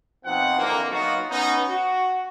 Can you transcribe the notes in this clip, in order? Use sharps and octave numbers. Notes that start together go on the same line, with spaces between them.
B2 F3 C4 D#4 F#5
F2 D3 E3 A#3
F#3 A#3 B3 D#4 F4 F#4
B3 C#4 D#4
F#4